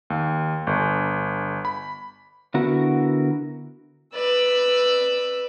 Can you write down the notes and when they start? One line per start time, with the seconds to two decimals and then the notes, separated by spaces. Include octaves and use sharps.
0.10 D#2
0.67 G1
1.65 B5
2.54 D3 B3 E4 F#4 A#4
4.15 B4 D5 E6